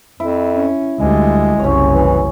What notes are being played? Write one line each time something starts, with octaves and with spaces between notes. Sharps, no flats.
F2 E4
C#4
D2 G3 G#3
F#1 C2 C#4 C#5
E3